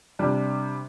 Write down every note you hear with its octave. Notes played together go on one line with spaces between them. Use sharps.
C3 G3 D4